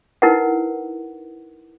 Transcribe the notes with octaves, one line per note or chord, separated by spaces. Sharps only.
D#4 E4 A#4 B4 F#5